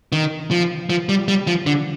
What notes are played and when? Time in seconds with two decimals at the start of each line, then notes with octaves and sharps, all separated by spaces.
0.12 D#3
0.51 F3
0.90 F3
1.09 G3
1.28 G3
1.47 F3
1.66 D3